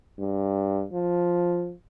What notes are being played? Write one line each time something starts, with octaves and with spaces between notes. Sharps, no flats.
G2
F3